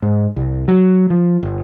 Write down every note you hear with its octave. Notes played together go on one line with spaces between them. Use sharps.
G#2
C2
F#3
F3
G1